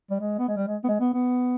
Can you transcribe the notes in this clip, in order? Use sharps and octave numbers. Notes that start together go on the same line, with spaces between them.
G3
G#3
B3
G#3
G3
G#3
B3
G#3
B3
B3